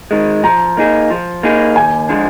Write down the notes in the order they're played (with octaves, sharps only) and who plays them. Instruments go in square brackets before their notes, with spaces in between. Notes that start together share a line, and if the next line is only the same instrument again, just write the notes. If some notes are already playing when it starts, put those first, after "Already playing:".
[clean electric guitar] D#3 G#3
[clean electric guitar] F3 [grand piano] A#5
[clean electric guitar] A#3 D#4 G#4
F3
A#3 D#4 G#4
[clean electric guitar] D#2 [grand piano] G#5
[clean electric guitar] D3 F3 G#3